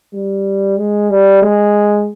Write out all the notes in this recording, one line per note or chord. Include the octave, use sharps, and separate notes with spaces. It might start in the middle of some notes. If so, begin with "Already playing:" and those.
G3
G#3
G3
G#3